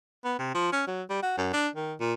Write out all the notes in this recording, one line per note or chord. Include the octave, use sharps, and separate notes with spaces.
B3
C3
F3
C#4
F#3
G3
F#4
F#2
D4
D#3
A#2